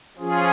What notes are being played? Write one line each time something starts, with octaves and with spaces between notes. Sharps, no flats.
F3 C#4 F4 G#4